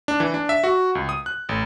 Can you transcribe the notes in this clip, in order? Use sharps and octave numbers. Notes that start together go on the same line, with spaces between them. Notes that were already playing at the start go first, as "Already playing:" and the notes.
D4
E3
D4
E5
F#4
C#2
D#6
F#6
A1